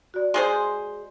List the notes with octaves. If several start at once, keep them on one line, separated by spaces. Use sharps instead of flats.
F#4 D5
G#3 G#4 C5